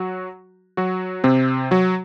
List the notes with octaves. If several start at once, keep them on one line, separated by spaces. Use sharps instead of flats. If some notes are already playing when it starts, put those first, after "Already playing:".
Already playing: F#3 F#4
F#3 F#4
C3 C4
F#3 F#4